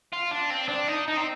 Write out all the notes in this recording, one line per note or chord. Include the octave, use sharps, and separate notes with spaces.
F4
D4
C4
D4
D#4
D#4
C4